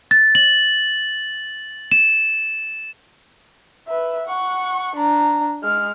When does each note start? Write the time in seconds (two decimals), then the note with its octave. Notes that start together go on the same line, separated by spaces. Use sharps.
0.11 A6
0.35 F#7
1.92 E7
3.88 B4 E5
4.27 F#5 C#6
4.96 D4 A#5
5.63 G#3 F6